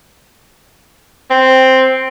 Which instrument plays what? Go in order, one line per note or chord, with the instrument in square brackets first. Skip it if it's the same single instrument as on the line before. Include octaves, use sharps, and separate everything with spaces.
[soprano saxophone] C4